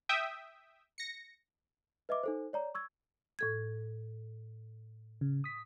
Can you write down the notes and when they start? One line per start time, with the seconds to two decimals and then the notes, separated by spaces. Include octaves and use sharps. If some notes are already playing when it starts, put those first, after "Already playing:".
0.09 E5 G5 D#6
0.98 A#6 C#7
2.09 B4 D#5 E5 D6
2.23 D#4 A4 C5
2.53 C#5 D5 A#5
2.75 C#6 E6 G#6
3.39 A2 A4 G#6
5.21 C#3
5.44 D#6 B6